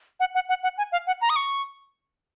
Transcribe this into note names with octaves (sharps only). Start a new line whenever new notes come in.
F#5
F#5
F#5
F#5
G#5
F5
F#5
A#5
D#6
C#6